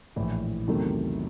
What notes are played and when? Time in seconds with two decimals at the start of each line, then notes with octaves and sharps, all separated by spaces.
0.16 A#1 A2 E3
0.68 E2 C3 D#3 F#3 A3